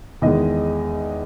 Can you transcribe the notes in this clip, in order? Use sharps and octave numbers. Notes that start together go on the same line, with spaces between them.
E2 D#3 G#3 D#5